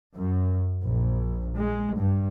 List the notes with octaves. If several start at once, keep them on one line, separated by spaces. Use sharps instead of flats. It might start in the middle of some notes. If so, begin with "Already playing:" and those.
F#2
A#1
G#3
G2